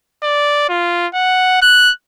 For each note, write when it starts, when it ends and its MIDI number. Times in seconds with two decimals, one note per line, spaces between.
0.23 0.66 74
0.69 1.07 65
1.14 1.58 78
1.62 1.92 90